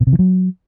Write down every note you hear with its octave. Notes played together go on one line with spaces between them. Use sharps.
B2
C3
E3
F#3